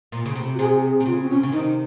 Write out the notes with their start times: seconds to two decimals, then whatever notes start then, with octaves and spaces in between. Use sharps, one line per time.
0.12 A#2
0.26 C#3
0.36 C3
0.55 F#4
0.59 C3 G#4
0.82 G#4
1.00 C3
1.06 C#3 F4
1.22 C4
1.30 C#4
1.33 C3
1.43 C#3
1.52 C3 D#3 D#4